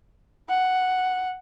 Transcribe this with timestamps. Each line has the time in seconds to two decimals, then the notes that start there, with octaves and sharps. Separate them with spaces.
0.49 F#5